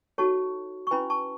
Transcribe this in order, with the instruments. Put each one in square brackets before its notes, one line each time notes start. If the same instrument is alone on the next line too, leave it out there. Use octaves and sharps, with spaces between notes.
[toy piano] D#4 F#4 A4 C#5 A5 C#6
C#6
C#4 E4 B4 G#5 B5
A5 C#6